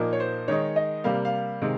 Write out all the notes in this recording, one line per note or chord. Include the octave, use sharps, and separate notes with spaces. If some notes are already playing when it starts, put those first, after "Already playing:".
Already playing: A#2 F3 A#3 D#4
C#5
C5
D#3 G#3 D#4 C#5
D#5
C3 G3 A#3 F5
F5
C3 D#3 G#3